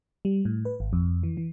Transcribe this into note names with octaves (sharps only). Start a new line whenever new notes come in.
G3
A2
B4
G#1
F2
E3
E3